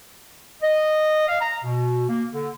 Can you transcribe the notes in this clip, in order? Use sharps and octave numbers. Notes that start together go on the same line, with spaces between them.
D#5
F5
A#5
B2
A#3
D3